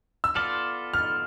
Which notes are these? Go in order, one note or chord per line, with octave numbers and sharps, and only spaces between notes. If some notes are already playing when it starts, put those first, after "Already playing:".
E6
B3 F4 A4 D5 F6
F6